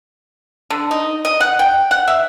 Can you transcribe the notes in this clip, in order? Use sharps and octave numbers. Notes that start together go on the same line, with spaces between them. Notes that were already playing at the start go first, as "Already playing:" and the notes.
D3
D#4
D#5
F#5
G5
F#5
E5